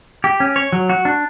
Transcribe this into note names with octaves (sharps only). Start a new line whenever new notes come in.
G4
C#4
C#5
F#3
F#4
D4